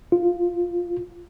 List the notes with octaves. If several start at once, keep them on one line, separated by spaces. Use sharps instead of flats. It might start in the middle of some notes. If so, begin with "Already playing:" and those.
F4